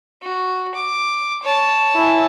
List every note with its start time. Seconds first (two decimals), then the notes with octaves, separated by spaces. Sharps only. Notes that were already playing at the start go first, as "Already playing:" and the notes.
0.22 F#4
0.74 D6
1.42 C#5 A5
1.95 E4 G#5